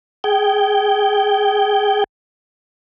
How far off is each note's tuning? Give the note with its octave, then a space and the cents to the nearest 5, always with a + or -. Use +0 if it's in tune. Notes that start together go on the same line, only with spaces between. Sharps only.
G#4 +0 G5 -10